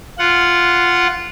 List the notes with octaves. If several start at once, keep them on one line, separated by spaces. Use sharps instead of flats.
F4 F#5